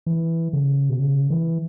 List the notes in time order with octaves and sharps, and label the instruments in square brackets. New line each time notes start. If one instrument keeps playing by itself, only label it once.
[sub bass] E3
C#3
B2
C#3
E3